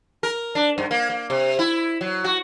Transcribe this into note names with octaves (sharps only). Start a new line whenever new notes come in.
A#4
D4
G2
A#3
A#3
C3
E4
F#3
F#4